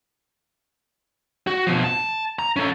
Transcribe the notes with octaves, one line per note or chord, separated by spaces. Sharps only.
F#4
B2 F3
A5
A#5
C#4 A4